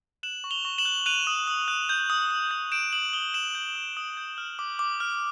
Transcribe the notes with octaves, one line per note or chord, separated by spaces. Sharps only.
F#6 E7 F#7
C#6
F7 G7
C#6
E7 F#7
F#6
F#6 D#7 F7
D#6
D#6
F#6
G6
D#6
D#6
G6
G6 D7 E7
D#6 E7 F#7
D#6 F7 G7
G6 E7 F#7
G6
D#6
D#6
G6
F6
D6
D6
F6